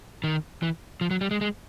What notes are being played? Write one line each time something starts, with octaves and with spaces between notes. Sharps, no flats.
D#3
E3
F3
F#3
G3
G#3
G#3